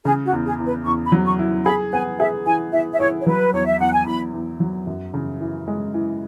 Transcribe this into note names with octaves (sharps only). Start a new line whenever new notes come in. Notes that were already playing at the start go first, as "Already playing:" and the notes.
C#3 G#4
F#4
E2
G#4
E2
B4
E2 C#6
B5
F#3
C#6
E4
G#4 B5
B3 G#5
G#4 E5
E3 G#5
E3 E5
E5
E4 C#5
C#5
F#3 B4
E2 C#5
E5
E2 F#5
G#5
E2 B5
E2
F#3
F#2
C#3
E3
G#3
E3